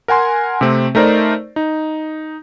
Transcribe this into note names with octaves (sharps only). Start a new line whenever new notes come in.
A#4 F#5 G#5 C6
C3 A3 C4
A3 D#4 A#4 C5 D5
D#4